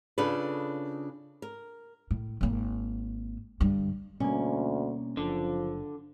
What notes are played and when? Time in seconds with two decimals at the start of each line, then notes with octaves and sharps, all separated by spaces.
0.18 C#3 D4 F4 A4 B4
1.42 A#4
2.11 A2
2.41 G#1 A#3
3.61 G2 D3
4.20 D2 B2 G3 A#3 C#4
5.17 F#1 D3 F3